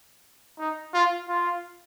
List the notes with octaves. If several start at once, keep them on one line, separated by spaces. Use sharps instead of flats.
D#4
F4
F4